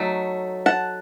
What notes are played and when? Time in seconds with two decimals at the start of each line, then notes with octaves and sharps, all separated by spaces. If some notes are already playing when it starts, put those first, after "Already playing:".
Already playing: F#3 A3 D#4
0.66 F#5 A5